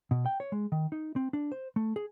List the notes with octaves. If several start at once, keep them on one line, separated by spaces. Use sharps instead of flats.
B2
G5
C#5
G#3
D#3
D#4
C4
D4
C5
A3
G#4